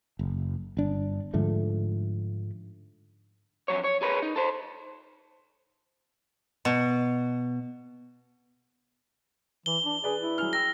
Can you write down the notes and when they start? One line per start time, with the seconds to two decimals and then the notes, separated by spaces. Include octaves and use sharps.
0.19 F#1
0.77 G1 D4
1.34 G#2 D3 F3 A3
3.68 F2 C3 F#3 C#5
3.84 C#5
4.02 G#4 A#4 B4 C#5
4.22 D#4
4.36 A4 C5
6.65 B2
9.66 E3 G7
9.85 D4
10.04 G#4 B4 D5
10.19 E4
10.38 F#3 G#4 F6
10.53 G5 E6 A#6